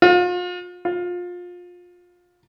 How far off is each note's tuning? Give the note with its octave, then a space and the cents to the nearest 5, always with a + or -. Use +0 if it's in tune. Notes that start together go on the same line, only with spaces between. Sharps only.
F4 +40
F4 +25